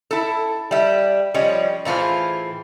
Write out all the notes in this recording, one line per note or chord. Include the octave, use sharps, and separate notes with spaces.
E4 A4
G3 E5
F3 G3 C#4 C#5 D#5
A2 E3 F4 G#4 C5